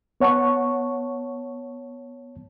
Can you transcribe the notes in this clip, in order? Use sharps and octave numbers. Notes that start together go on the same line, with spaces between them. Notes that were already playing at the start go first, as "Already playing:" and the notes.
B3 C#5 F#5 A5 C#6